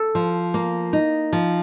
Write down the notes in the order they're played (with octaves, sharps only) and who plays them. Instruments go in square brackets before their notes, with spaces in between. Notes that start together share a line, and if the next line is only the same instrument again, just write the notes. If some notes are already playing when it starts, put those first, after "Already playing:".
Already playing: [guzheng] A4
[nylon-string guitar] F3
A#3
D#4
F3